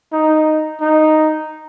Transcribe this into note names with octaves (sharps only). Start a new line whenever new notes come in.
D#4
D#4